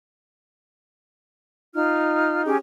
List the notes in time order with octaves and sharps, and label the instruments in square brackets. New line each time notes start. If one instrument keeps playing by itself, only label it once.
[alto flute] D#4 [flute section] F4 F6
[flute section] C#4 G4 G#4